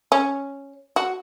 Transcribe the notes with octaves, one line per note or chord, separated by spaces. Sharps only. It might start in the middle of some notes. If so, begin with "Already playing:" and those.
C#4
F#4